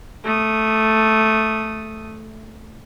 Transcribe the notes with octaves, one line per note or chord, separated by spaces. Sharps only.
A3 D#6